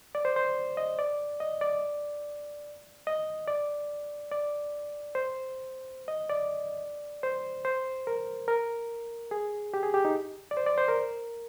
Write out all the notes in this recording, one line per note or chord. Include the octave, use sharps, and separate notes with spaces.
D5
C5
C5
D#5
D5
D#5
D5
D#5
D5
D5
C5
D#5
D5
C5
C5
A#4
A#4
G#4
G4
G#4
G4
D#4
D5
C5
D5
C5
A#4